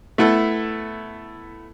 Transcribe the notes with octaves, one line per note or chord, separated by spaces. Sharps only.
A3 B3 E4 A4